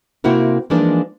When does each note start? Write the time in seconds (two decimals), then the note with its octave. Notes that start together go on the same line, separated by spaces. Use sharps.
0.24 C3 A#3 C4 E4 F#4 A#4
0.70 E3 F3 G#3 A#3 D4 D#4